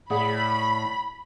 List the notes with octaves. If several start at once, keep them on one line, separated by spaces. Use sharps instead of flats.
A2 G#4 D5 F#5 B5